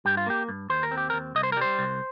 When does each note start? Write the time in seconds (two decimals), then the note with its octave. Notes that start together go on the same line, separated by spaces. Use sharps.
0.05 G2 G4
0.17 F4
0.26 A#3 G4
0.49 G2
0.70 D#2 C5
0.83 A#4
0.91 C4
0.97 G4
1.10 A#4
1.13 D#2
1.35 C2 D#5
1.43 C5
1.52 A#4
1.57 G3 C5
1.79 C2